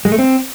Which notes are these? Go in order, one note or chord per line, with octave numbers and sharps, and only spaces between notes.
G#3
A3
C4